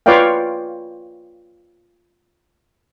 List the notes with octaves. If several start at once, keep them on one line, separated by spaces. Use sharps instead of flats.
F4 B4 C#5 D5 F5 G5